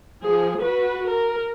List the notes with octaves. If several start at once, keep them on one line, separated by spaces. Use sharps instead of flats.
F3 G#4
F#4 B4
A#4